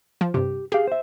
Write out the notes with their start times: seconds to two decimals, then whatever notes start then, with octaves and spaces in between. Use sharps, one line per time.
0.21 F3
0.34 G2 C3 G4
0.72 G4 G#4 F5
0.87 C5 E5